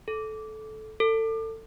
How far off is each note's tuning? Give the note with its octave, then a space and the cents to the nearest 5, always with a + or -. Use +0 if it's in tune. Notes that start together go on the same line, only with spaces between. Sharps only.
A4 -15
A4 +25